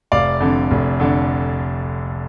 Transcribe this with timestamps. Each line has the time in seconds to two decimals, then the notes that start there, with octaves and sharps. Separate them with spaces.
0.12 F1 D5 F5
0.40 F2 D3
0.71 F1
0.99 F2 D3